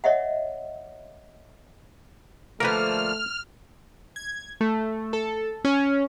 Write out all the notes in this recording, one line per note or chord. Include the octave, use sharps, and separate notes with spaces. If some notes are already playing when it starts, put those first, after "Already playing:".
C#5 D#5 E5 F#5
D3 F3 A3 A#3 A#4 B4 F6
G#6
A3
A4
C#4